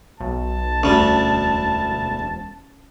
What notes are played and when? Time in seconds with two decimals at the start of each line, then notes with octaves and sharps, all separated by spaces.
0.20 B1 A5
0.83 E1 D2 G3 C#4